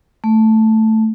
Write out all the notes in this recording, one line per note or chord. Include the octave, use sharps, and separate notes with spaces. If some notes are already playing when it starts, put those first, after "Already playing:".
A3